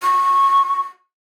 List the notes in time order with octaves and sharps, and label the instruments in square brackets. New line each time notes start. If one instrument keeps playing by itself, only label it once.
[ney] C#6